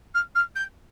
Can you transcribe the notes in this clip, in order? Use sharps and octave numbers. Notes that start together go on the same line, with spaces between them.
F6
F6
G6